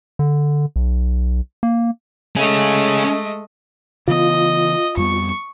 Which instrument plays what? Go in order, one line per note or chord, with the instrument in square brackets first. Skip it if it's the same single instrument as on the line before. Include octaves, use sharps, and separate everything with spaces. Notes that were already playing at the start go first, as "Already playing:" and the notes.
[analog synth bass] D3
B1
A#3
[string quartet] G#3 A3 D#5 [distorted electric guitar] C#4 G#4
[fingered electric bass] C#3 E3 B3 [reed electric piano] F4 [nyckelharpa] D#5
[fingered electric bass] F2 G3 B3 [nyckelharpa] C#6